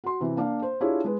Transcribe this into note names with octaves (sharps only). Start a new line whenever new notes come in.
F#4 C6
C3 E3
A#3 D4 F5
C5
D4 E4 F4 G4 G#4 C#5
G#3 B4